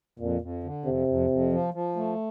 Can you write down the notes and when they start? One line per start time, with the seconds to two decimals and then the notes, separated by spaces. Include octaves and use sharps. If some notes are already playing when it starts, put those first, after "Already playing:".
0.20 F2 A#2
0.42 F2
0.64 D3
0.85 F2 C3
1.07 F2
1.30 F2
1.52 F3
1.74 F3
1.96 A3